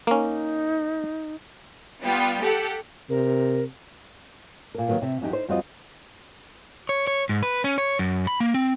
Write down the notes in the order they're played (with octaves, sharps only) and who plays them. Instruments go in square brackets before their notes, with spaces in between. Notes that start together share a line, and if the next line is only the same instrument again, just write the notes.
[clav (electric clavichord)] A#3 C#4 [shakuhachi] D#4
[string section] G3 B3 F4
G4 A4 F#5
[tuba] C3 [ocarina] A#4
[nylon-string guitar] A#2 A#4
D#3 E3 F#3 A#3 B3
C3 E5
E2 F#3 D#4 G4
D#4 C5
F2 G3 F4 F#4 C5 D#5
[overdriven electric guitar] C#5
C#5
G#2
B4
C#4
C#5
F#2
B5
A#3
C4